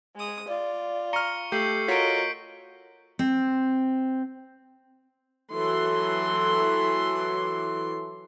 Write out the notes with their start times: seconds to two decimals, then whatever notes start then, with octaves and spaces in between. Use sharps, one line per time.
0.16 G#3 D#6
0.48 F4 D5
1.13 A#5 C#6 F6 C#7 G7
1.52 A3 G4 A4 G6 C7 F#7
1.88 F4 F#4 A#4 C#5 D#5 B6 D7
3.19 C4
5.54 E3 F#3 A4 C6